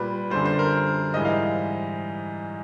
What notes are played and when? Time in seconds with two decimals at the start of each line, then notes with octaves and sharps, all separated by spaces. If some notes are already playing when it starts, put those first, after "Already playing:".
Already playing: A#2 G3 B4
0.30 F#2 D3 G3 C5
0.45 C5
0.59 A#4
1.14 G#2 E3 G3 D#5
1.25 F5